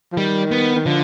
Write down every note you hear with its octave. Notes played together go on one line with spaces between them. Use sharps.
F3
D#3 G3
B3
D#3
D3 F3